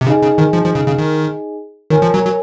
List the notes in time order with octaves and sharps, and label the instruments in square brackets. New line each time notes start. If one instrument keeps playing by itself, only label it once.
[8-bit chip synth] C3
[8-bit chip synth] C#3 [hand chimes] D#4 G#4 D#5 G#5
[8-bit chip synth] C#3
D#3
F3
F3
C#3
C#3
D#3
[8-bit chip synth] D#3 [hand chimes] F4 A#4 C#5 G#5
[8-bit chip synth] F3
F#3
F#3